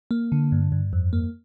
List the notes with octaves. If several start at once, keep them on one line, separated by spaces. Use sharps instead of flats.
A#3
D3
G2
G2
F2
A#3